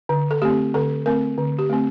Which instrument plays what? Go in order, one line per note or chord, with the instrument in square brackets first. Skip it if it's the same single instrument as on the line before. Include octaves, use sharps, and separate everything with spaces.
[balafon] D3
A4
A3 C4 G4
D3 A4
A3 C4 A#4
D3
G4
A3 C4